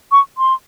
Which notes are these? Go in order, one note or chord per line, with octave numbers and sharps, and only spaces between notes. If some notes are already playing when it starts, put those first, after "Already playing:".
C#6
C6